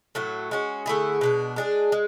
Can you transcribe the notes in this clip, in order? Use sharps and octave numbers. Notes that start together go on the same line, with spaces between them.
A2 F#3 A3
G#3 C#4 F#4
D3 A3 E4 G#4
B2 G#3 D4
G#3 D4 G#4
G#3